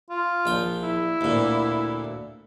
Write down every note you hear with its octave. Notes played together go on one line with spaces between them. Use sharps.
F4
A#1 G5
E4
D2 A#2